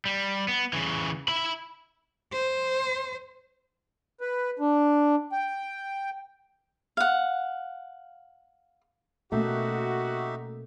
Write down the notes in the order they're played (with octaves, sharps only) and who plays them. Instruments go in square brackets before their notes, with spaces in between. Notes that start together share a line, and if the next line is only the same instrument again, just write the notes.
[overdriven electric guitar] G3
B3
C#3 E3
E5 B5
[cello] C5
[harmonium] B4
D4
G5
[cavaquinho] F5 F#5
[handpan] B2 A#3 C#4 [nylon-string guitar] A3 [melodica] D#4 G4 E5 [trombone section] F#4